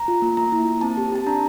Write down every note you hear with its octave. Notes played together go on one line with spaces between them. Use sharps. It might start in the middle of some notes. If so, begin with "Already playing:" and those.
Already playing: A#5
F4
A#3
A#3 A#5
E4
A#3
C4 A5
G4
G4 A5
D4 A#5